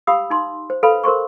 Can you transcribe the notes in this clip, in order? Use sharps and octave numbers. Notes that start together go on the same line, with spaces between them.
G4 F5 B5 D#6 E6
D#4 C6
C5
A4 B4 F5 B5
A#4 C5 C6 C#6